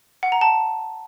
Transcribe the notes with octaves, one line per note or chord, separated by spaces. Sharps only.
F#5
A#5
A5